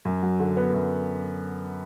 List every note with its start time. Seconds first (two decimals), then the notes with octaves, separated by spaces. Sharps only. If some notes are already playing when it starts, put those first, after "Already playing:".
0.05 F#2
0.23 F#3
0.40 D3
0.57 B3
0.74 F#2